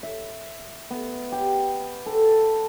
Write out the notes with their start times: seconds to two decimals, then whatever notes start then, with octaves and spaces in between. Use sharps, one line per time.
0.03 E5
0.91 B3
1.32 G4
2.06 A4